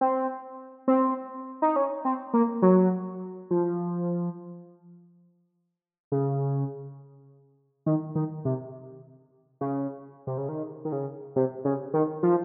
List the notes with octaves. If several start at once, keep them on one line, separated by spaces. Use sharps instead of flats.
C4
C4
D#4
C#4
C4
A#3
F#3
F3
C#3
D#3
D#3
C3
C#3
C3
C#3
D#3
D#3
C#3
C3
C#3
D#3
F3